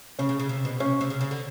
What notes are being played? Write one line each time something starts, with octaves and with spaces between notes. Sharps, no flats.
C#3 C#4
C#3
C#3
C3
B2
C3 C#4
C3
C#3
C#3
D3